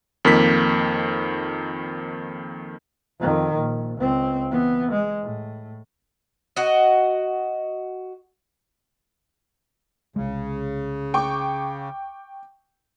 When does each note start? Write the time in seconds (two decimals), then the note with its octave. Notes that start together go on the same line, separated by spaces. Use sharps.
0.25 F2 D#3 A#3 B6
3.20 F2 D#3
3.55 A#1
3.98 C#2 C4
4.51 E3 B3
4.92 G#3
5.22 A2
6.56 F#4 D#5
10.16 C2 C#3 G#3
11.14 G5 C#6 D6